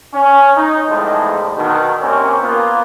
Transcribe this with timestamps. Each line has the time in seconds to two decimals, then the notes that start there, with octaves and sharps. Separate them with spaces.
0.14 C#4
0.57 D#4
0.89 E2 A2 F3 G3 G#3 D#4
1.57 B2 D3 D#3
2.03 C3 A#3 C4 C#4
2.42 A#3 B3 F4